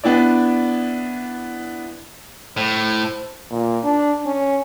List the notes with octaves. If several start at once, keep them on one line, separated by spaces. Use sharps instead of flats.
B3 D4 E4 D5
A2 C5
A#2
D4
C#4